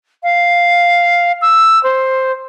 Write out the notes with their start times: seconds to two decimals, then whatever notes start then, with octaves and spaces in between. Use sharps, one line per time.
0.23 F5
1.42 E6
1.83 C5